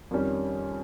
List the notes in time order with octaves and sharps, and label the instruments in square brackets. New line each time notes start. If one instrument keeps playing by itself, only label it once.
[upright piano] F2 D#3 G3 C#4